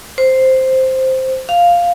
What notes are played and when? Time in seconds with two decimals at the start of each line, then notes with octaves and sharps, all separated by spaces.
0.18 C5
1.49 F5